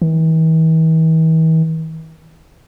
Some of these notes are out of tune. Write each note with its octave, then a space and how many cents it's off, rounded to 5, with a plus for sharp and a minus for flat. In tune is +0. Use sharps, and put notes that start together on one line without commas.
E3 -45